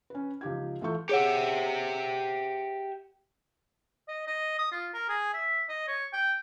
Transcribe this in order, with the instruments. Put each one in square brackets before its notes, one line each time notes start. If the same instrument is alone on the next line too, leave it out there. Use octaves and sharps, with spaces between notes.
[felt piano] C#4 B4
C#2 F3 D#4 G4 G5 G#6
A1 A3 F4 A4 C#6 G6
[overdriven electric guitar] G4 E5 [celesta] G#4 C#5 F#5
[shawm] D#5
D#5
D#6
F4
A#4
G#4
E5
D#5
C#5
G5